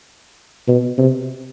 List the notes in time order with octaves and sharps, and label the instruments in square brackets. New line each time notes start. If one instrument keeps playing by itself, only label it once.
[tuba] B2
C3